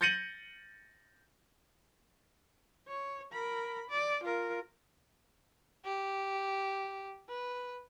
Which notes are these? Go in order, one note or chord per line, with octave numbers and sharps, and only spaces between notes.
G6 A6 A#6 C#7 D#7 F#7
C#5
A#4 B5
D5
F4 A#4
G4
B4